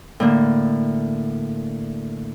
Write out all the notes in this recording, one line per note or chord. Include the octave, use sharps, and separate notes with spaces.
A2 D3 A#3